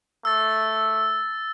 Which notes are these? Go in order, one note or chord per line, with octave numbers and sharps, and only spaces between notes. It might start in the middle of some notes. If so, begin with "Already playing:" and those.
A3 E6 A6